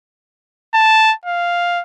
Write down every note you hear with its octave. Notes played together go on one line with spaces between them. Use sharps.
A5
F5